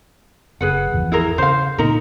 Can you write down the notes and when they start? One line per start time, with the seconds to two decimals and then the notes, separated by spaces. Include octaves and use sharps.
0.61 F#1 G#4 B4 F#5
0.92 G#1 E2 F3
1.12 E4 G#4 A#4
1.38 C#3 C5 F5
1.78 A#2 D3 D#4 A#4